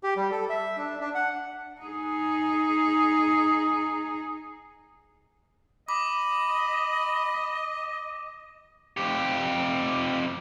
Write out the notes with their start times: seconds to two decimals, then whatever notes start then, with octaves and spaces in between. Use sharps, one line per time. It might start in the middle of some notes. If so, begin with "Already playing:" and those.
0.03 G4
0.16 G3
0.31 A4
0.50 E5
0.77 D4
1.00 D4
1.15 F#5
1.81 D#4 G#4
5.89 D#5 B5 D6
8.97 F2 G4